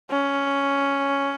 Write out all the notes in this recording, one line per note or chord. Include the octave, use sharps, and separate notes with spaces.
C#4